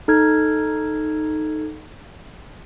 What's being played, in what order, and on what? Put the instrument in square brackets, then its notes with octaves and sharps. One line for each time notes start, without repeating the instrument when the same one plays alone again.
[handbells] D#4 A4 F6 G#6